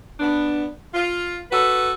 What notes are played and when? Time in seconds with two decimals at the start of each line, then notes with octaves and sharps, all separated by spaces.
0.20 B3 D4
0.94 F4
1.51 F#4 A4 B4